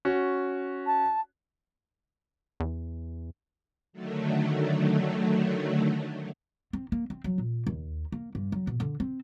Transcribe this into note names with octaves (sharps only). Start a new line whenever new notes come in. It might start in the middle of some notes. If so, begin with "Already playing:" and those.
C#4 F#4
A5
E2
D3 D#3 F#3 A3
C4
A#3
C4
F#3
A#2
D#2
A#3
G2
F#3
B2
D3
C4